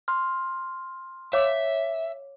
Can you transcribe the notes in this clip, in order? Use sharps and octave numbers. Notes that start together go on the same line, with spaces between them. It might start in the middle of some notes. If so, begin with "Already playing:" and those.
C6 F6
C#5 E5 F5 D6